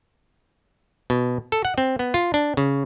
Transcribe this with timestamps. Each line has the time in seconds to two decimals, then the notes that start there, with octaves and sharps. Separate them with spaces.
1.10 B2
1.52 A4
1.65 F#5
1.78 C4
1.99 B3
2.14 F4
2.34 D4
2.57 C#3